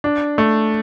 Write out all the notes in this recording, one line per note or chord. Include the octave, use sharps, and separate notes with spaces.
D4
A3